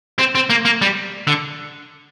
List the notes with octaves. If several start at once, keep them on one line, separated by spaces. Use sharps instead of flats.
C4
C4
A#3
A#3
G3
D3